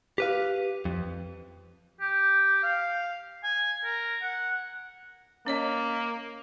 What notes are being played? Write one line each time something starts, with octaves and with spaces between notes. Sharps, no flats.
G4 B4 F5
F2
G4
F5
G#5
A#4
F#5
A#3 C#4 C#5 D#5